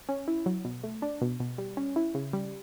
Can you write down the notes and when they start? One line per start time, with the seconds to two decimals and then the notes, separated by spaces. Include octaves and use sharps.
0.09 C#4
0.28 E4
0.46 F#3
0.65 B2
0.84 A3
1.02 D4
1.21 B2
1.40 B2
1.58 G3
1.77 C#4
1.96 E4
2.15 C#3
2.33 G3